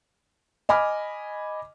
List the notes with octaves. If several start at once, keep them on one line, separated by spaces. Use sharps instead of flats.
D#5 G#5 B5 D6 F6